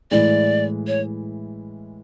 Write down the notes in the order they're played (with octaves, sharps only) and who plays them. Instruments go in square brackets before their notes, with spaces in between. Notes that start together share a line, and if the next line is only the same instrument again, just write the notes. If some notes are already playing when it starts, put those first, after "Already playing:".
[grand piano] A2 E3 G#3 [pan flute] D5
[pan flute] C#5